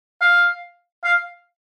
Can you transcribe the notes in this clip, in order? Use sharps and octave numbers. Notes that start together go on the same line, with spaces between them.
F5
F5